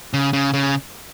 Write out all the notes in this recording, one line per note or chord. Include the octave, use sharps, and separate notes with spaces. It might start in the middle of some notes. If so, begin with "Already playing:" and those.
C#3
C#3
C#3